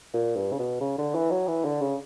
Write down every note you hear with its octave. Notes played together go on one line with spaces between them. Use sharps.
A#2
G2
C#3
B2
C#3
D3
E3
F#3
E3
D3
C#3